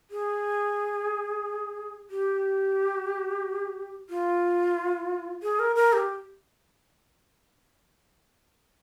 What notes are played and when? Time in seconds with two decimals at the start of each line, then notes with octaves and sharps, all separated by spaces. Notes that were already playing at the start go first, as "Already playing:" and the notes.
0.11 G#4
2.11 G4
4.10 F4
5.43 G#4
5.59 A#4
5.76 A#4
5.93 G4